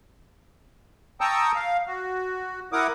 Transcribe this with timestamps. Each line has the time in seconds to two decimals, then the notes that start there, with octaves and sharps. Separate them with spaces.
1.21 G5 A5 A#5 C#6 D#6 E6
1.56 F5
1.87 F#4
2.72 E4 A#4 F#5 D6 D#6